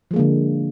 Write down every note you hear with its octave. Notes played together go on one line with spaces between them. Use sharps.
D3 F3 G#3 A#3